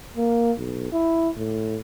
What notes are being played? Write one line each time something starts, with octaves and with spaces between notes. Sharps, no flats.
A#3
B1
E4
A2